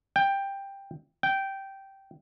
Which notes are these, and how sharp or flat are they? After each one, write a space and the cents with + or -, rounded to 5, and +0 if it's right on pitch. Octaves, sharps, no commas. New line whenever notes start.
G5 +10
G5 -10